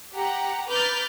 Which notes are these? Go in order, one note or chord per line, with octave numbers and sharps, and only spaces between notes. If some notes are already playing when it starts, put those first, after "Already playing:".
G4 F#5 A#5
B4 A#5 D6 F6 G6 A6